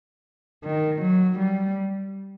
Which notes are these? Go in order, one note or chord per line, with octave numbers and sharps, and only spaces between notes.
D#3
F#3
G3